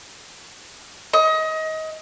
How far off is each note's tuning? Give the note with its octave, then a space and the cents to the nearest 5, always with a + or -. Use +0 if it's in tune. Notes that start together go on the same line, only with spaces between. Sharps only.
D#5 +25